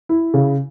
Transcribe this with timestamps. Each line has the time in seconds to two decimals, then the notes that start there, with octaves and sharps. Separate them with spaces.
0.09 E4
0.34 C#3